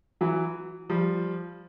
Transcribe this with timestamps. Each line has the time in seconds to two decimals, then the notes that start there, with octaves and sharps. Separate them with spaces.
0.21 E3 F#3
0.90 F3 G3